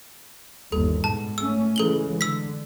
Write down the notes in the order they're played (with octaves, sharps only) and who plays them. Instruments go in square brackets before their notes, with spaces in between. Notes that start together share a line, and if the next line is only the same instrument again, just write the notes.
[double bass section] G1 D#2 [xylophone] A4
[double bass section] G#2 B2 [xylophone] A5
[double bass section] A3 C#4 [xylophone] E6
[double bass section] C#3 E3 G#3 [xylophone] A4 F#7 G7
[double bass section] D3 [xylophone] E6 B6